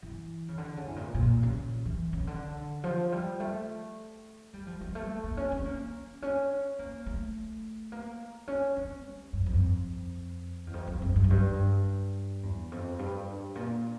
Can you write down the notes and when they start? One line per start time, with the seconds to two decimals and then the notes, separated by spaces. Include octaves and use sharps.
0.02 E3
0.49 C#3
0.58 D3
0.77 C#3
0.87 A2
0.96 A#2
1.14 A#2
1.43 C#3
1.86 E3
2.13 C#3
2.27 D3
2.84 F3
3.12 G3
3.40 A3
4.54 G3
4.67 F3
4.81 G3
4.95 A3
5.24 A#3
5.37 C#4
5.52 C#4
5.66 A#3
6.22 C#4
6.79 A#3
7.06 A3
7.92 A#3
8.48 C#4
8.76 C#4
9.04 G3
9.33 G2
9.46 F2
10.67 E2
10.73 F2
10.87 F2
11.02 G2
11.16 G2
11.24 F2
11.30 G2
12.43 E2
12.72 F2
12.99 G2
13.55 A#2